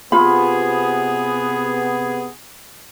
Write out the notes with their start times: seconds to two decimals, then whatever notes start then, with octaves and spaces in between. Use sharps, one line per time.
0.12 C3 B3 F4 G#4 B5